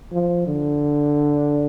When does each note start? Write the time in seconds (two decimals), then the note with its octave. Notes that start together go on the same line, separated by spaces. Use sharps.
0.12 F3
0.47 D3